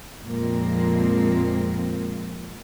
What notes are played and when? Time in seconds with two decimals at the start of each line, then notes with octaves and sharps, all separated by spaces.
0.22 F2 A#2 F3 G#3 A#3 C4